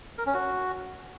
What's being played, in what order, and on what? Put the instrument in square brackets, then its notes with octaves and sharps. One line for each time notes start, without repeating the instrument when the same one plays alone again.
[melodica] A#4
C#4
F#4